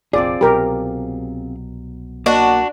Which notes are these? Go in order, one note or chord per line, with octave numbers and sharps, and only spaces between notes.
F1 A#1 C4 F4 G#4 D5
C2 B2 F#3 G4 A#4
A#3 D4 F#4 D#5